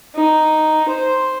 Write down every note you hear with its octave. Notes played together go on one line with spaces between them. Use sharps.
D#4
C5